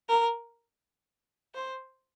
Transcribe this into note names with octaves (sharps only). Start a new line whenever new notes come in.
A#4
C5